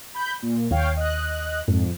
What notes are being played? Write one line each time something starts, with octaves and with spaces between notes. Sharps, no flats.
B5 G6
A#2
D#2 C#5 F5 G5
D#5 F#6
F2 G#2